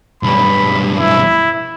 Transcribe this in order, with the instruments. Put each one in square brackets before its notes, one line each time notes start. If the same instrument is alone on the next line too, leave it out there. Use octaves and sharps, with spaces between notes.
[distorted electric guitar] B1 G2 [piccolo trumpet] B5
[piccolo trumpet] E4